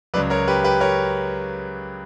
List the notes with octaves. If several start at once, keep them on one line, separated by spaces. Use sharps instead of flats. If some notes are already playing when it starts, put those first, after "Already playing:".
C#2 C#3 F#3 B4 D5
A#4 C#5
G4 B4
G4 B4
A#4 C#5